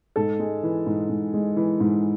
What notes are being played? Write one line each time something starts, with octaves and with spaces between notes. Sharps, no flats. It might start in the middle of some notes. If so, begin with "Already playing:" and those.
G#2 A4
G#3
E3
G#2
G#2
G#3
E3
G#2